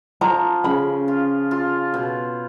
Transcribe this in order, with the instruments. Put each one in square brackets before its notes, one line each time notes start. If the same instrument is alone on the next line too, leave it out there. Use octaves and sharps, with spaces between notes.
[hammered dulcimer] F3 [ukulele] A#5
[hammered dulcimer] C#3 [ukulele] B5
[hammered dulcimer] F4
F4
B2